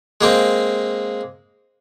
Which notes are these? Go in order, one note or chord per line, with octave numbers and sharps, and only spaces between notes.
G#3 A#3 C4